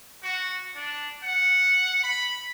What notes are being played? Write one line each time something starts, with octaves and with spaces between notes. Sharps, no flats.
F#4
D4
F#5
B5